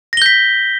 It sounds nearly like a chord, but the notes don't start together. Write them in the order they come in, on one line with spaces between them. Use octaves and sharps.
A#6 G7 G6 B6